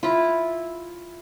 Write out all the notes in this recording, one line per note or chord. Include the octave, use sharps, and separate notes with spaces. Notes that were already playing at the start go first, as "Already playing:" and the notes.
E4 F4